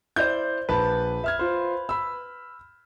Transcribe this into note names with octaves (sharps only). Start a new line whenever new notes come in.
E4 C5 D5 G6
A#1 B4 A5
E5 F6 G#6
F4 C5
B5 E6